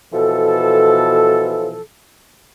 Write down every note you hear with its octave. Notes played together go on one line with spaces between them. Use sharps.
B2 E3 F3 A4